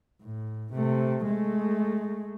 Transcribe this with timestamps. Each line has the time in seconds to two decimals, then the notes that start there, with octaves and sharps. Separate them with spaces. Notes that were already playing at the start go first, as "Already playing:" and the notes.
0.22 A2
0.73 C3 A3
1.24 G#3 A3